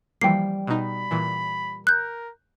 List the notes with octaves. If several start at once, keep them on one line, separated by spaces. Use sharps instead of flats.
E3 F3 G3 A#3 G5 C7
B2 D#4 B5
A#2 E3
A#4 F#6 G6